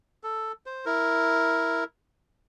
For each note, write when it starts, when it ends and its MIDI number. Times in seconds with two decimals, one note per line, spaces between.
0.23 0.52 69
0.66 0.85 72
0.86 1.84 64
0.86 1.84 70